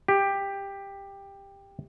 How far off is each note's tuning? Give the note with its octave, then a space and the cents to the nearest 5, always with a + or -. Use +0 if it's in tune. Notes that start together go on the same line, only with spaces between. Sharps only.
G4 +15